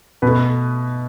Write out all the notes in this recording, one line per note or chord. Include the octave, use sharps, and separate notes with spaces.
B2 B4
A3